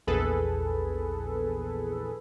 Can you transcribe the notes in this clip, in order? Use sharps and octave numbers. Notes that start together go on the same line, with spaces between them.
A#1 E2 G#4 A4 B4